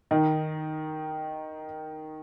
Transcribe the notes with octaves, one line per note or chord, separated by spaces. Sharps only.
D#3 D#4